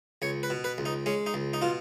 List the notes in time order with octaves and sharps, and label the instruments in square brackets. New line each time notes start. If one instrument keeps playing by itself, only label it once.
[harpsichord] C#2 C#5
B4
B2
B4
C#2
D#4
G#3 C#4
D#4
C#2
D#4
B2 F4